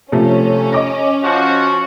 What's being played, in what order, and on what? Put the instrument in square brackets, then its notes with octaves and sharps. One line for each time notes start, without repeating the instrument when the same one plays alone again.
[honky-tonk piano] C3 F3 A3 [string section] C#4
[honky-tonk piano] D#5 D6 A#6
[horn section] F3 F#4